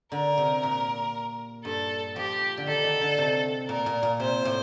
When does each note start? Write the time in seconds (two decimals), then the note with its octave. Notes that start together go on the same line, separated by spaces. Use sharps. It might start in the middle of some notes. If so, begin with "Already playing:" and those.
0.12 D3 A#4
0.38 C3
0.63 A#2
1.65 G2 A4
2.16 F3 G4
2.57 D3
2.67 D#3 A4
2.84 D#3
3.01 D3
3.18 C3
3.68 A#2 A#4
3.86 A#2
4.03 A#2
4.20 C3 C5
4.45 A2